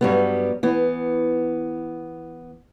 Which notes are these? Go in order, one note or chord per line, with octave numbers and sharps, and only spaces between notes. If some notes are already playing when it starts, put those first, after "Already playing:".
G2 F#3 G3 B3
E3 B3